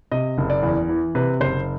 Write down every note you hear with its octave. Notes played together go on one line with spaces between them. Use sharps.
C3 D#5
F#1
D5
E2
E3
C3 B4
F#1 C5